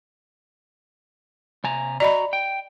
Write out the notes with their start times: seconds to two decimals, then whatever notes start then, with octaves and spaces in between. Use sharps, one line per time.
1.64 C3 G#5 A#5
2.00 F#4 D5 D#5 A#5 B5
2.33 G5